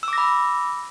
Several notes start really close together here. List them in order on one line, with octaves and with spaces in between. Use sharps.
E6 D6 A#6 B5